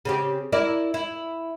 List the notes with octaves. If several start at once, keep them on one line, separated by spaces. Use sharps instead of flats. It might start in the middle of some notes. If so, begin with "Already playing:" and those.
C#3 C4 G4
E4 A#4 D5
E4